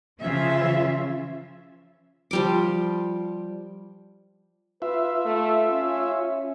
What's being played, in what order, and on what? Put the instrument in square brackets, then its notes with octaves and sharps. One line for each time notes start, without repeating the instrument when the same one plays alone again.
[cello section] C#3 F3 C#4 F4 E5
[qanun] F3 G3 D6
[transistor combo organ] F4 E5 [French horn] B4
[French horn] A3
C#4